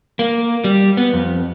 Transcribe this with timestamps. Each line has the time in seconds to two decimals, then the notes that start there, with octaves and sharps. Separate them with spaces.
0.19 A#3
0.64 G3
0.97 B3
1.13 F2